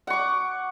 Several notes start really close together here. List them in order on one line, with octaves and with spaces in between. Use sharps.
F#5 C#6 D6